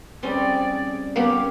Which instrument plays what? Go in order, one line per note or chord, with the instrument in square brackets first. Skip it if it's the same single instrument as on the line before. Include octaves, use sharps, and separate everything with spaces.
[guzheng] G3 C4 C#4 [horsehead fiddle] G#4 D5
[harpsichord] A#3 B3 [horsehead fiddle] C#4 F5 [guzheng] G4